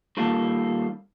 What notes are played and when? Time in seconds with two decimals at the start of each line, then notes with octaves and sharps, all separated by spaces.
0.17 D#3 G3 A#3 F4 A4